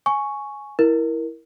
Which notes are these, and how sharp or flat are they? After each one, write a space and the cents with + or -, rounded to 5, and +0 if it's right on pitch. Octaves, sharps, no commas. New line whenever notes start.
G#5 +10 C#6 +0
E4 -5 A#4 +10